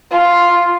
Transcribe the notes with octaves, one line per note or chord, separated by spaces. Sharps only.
F4